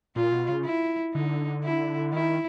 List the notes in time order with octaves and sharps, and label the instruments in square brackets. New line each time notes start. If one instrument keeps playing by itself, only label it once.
[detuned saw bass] A#2 [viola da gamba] F4
[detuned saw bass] B2
C#3
[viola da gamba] E4
[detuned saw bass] D3 [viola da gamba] D#4
[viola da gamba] E4
[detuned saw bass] D#3 [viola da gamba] E4